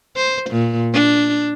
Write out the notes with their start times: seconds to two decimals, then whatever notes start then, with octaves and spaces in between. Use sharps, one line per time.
0.16 C5
0.50 A#2
0.93 D4